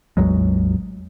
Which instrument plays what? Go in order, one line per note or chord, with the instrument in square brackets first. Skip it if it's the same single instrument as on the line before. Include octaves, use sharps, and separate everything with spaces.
[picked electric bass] A1 E2 F#3 G#3